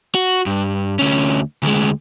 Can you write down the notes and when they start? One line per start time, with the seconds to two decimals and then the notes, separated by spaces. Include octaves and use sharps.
0.15 F#4
0.46 G2
0.99 D2 C#4
1.63 D2 G#3